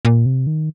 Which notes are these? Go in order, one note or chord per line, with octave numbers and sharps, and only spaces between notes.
A#2
C3
D#3